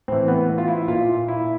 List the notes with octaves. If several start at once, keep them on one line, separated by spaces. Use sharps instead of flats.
A2 E3 C4
B3
F4
E4
A#2 F4
E4